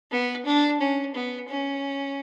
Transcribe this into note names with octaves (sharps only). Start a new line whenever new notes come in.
B3
D4
C#4
B3
C#4